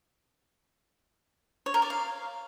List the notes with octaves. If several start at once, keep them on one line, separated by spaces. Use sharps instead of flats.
C#5
A#4
D5
F5